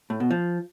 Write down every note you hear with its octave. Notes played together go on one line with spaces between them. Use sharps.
A2
B2
F3